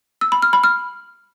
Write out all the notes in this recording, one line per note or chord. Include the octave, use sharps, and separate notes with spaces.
E6
B5
F6
B5
F6